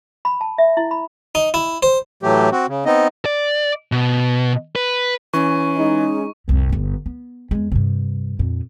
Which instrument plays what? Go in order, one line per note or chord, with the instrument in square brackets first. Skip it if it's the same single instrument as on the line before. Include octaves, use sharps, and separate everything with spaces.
[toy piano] B5
A5
E5
E4
B5
[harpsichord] D#4
E4
C5
[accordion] A2 E3 F#3 A3 G4
C4 F#4
C#3
B3 C4 D#4 D#5
[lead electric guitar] D5
B2
B4
[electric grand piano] E3 [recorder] C#4 [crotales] C#6
[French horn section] G#3 D#4
[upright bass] C2 F2
G1 G2
B3
E2 G#3
G2 C3
F2 A#2